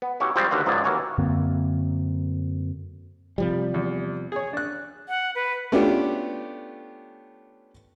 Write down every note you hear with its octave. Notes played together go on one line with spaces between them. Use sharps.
B3
C#4 E4 F#4 G4 C#5
F3 G3 G#3 C4
D#2 D3 F#4 B4 F5
C#2 G#2 F3 F#3 G#4 D5
D#2 E3 A#3 F#4 C#5 G#5
F#2 D3 A#3 C4
C3 F3 G3
E2
G#4 C#5
D4 F#6
F#5
B4
A3 B3 C#4 D4 F4 G4